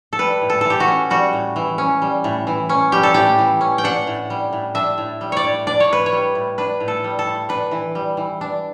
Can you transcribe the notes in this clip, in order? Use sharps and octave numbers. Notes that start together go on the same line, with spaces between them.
A4
G3 B4
A2
A4
E3 A4
G4
F#4
C#4
G3 F#4
A2
E3
C#4
G3
A2
E3
C#4
G3 G4
A4
A2 G4
E3
C#4
G5
D4 F#5
A2
G3
A2
D4 E5
A2
G3
C#5 D5
A2
D4 D5
C#5
A2 B4
C#5
G3
A2
D4 B4
A2
A4
G3
A4
A2
D4 B4
E3
G3
E3
D4